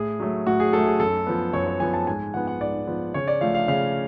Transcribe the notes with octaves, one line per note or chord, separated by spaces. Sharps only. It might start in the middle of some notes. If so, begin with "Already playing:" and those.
Already playing: A2 G#4
F#3 A3
A2 F#4
G#4
F#3 A3 A4
G#4
F#2 A4
F3 B3
F#2 C#5
C#5
F3 B3 G#5
A5
G#2 G#5
F3 B3 F#5
F#5
G#2 D5
F3 B3
C#3 C#5
D5
F3 A3 F5
F5
C#3 F5